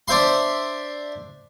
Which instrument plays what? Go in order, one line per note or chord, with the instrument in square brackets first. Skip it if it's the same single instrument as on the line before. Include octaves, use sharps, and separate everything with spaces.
[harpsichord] D4 C5 E5 C6